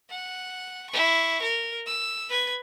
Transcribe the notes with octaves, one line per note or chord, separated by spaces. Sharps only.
F#5
E4 C#6
A#4
E6
B4 G#6